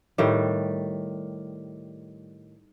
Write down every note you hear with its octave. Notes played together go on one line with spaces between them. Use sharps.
A2 D#3 G3